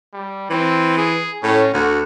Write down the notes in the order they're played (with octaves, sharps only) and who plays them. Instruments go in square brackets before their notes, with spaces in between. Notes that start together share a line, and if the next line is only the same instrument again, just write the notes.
[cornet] G3
[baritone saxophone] E3 [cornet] C4
[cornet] G#4
[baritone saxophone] A2 [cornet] C#4
[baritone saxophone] D2 [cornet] F#4